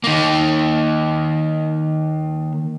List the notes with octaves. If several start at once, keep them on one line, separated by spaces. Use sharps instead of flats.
D#3 A#3